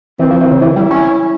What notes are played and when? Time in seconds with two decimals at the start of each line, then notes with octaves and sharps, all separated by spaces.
0.19 E3 C4
0.30 F3
0.40 E3
0.51 C#3
0.61 E3 E4
0.76 G3
0.91 C#4